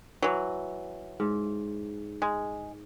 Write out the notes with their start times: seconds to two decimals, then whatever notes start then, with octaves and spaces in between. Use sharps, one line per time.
0.22 E3 F#3
1.20 G#2
2.22 G#3